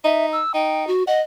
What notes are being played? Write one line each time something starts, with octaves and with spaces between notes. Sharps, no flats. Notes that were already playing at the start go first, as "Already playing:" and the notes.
D#4 E5
E6
D#4 G5
F#4
D#5 F#5